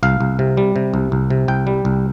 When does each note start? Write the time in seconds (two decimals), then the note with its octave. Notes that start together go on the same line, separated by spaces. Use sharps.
0.03 C2 F5
0.21 C2
0.39 C3
0.57 G3
0.76 C3
0.94 C2
1.12 C2
1.30 C3
1.48 C2 G5
1.67 G3
1.85 C2